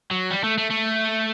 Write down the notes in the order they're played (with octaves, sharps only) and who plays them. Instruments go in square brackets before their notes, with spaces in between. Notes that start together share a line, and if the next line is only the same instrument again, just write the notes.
[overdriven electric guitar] F#3
G3
A3
A3
A3